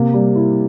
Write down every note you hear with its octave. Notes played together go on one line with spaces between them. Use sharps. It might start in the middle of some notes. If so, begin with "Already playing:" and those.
Already playing: C3 A#3
G3
E4